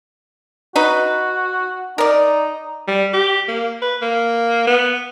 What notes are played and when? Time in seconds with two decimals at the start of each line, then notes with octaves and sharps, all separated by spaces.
0.76 D#4 F#4 B4
1.98 D#4 A#4 D5
2.88 G3
3.13 G4
3.48 A#3
3.82 B4
4.02 A#3
4.67 B3